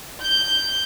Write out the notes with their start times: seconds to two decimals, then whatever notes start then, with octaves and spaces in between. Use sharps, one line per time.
0.22 G6